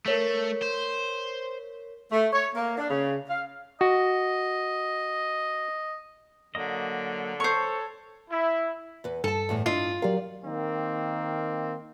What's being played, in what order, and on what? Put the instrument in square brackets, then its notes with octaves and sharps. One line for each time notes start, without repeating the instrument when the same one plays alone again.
[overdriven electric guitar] A3 [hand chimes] A#4 C#5 B6
[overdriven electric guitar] C5
[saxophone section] A3
C#5
A#3
D4
C#3
F5
[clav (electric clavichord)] F#4 [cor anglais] D#5
[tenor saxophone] D3 [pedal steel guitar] F#3 A#3 D#5
[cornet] A4 [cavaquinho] C5 C#6 [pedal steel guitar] C#5
[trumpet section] E4
[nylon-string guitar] E2 B4
[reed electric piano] G2 [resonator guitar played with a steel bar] A4 [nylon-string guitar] G#5 A5
[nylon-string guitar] E2 A2 E3
[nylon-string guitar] D4 E4 D#5 [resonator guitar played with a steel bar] F4
[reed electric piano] F#3 G4 A#4 [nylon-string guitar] D5 F5
[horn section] D#3 A#3 C4